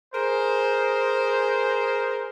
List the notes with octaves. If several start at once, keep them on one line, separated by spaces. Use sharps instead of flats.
G#4 A#4 C5